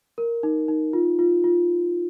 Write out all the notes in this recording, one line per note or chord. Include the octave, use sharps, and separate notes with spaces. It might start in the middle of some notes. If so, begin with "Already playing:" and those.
A#4
D#4
D#4
F4
F4
F4